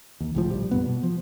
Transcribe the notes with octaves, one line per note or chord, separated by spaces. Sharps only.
D#2
C#2 A2 F3
A#1 G3
G2 A#2 B3
B2
F3